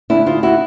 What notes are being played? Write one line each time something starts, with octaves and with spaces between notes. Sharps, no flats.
D2 D4 E4
D2 D#4 F4
E4 F#4